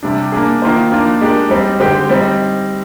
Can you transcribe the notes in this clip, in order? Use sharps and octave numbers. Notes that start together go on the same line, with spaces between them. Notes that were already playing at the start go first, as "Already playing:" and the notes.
C3 G3 D4
A#3 D4 G#4
D#3 A#3 F4 C5
F3 A#3 D4 F4
G#3 D4 G4 A#4
G3 C4 D#4
D3 G#3 C4 G4 C5
G3 C4 D#4